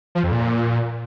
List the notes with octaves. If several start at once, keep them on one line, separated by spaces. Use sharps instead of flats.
F3
F2
A#2